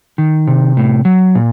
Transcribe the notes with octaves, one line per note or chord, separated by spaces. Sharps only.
D#3
C3
A2
F#3
A#2